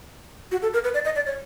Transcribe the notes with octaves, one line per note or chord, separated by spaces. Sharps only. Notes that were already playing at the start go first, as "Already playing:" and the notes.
F#4
A4
A#4
B4
D5
D#5
D5
C#5